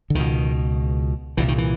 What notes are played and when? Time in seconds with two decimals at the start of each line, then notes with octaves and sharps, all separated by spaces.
0.10 D3
0.15 C#2 B2 D#3
1.37 C2 A#2 E3
1.48 D#3
1.58 E3